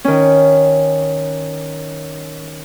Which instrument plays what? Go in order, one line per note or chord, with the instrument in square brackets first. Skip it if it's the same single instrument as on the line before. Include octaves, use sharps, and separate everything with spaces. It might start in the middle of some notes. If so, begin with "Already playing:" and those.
[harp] D#3 C#4